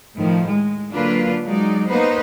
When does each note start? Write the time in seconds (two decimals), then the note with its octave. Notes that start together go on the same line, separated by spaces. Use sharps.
0.18 A2 D#3 F3
0.50 G#3
0.92 D3 F#3 A#3 D4 F4 B4
1.46 F#3 G#3 D#4 D5
1.88 A#3 B3 D#4 B4 C5